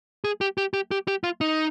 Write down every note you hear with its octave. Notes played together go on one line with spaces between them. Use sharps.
G#4
G4
G4
G4
G4
G4
F4
D#4